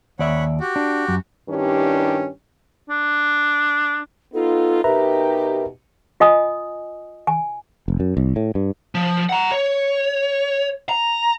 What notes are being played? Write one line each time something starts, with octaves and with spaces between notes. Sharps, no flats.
D#2 C#5 D5 E5 F#5 B5
F#4 G4
D4
F#2
G2 D#3 C#4 D4 E4 G4
D4
B3 D#4 F4 A4
B2 D#4 G4 A#4 B4 E5 A#5
F4 D#5 G#5 D#6
G#5
F1
F#2
C2
A2
G2
F3
F#5 A#5
C#5
A#5